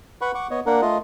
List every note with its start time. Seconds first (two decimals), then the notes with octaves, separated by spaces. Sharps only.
0.21 B4 F#5 B5 C#6
0.35 F#5 C#6 D6
0.51 B3 C#5 D#5
0.66 A#3 D4 A#4 F#5
0.82 A3 F4 D#5